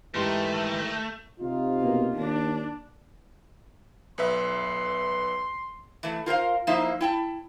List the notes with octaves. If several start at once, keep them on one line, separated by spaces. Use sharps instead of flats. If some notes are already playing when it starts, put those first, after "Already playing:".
G#2 E3 A3 G4 A#4 G5 C6
C3 D#4 F4
B2 A#3
D#2 D4
B1 B4 E5 C6
E3 A3
F4 A#4 C5 F5
F3 A#3 D#4 E4 C5 E5
E4 G5 A5